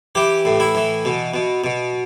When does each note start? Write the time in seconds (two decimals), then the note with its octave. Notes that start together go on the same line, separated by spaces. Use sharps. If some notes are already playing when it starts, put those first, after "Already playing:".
0.15 E3 G4
0.45 A2
0.60 E4
0.75 E3
1.05 B2
1.34 B2
1.64 B2